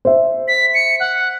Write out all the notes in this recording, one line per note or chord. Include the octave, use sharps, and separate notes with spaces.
C5 E5
B6
C#7
F#5